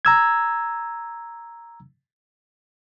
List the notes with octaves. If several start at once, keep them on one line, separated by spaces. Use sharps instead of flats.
A#5 E6 G#6